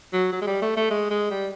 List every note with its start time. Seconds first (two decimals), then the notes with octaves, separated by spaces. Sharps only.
0.13 F#3
0.33 F#3
0.42 G#3
0.47 G3
0.62 A3
0.77 A3
0.91 G#3
1.10 G#3
1.31 G3